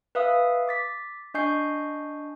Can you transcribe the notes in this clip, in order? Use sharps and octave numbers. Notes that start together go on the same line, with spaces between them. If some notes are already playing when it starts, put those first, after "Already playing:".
B4 E5 F5 D#6
D6 A6 B6
D4 D#5 G#5 C#6 G6 C7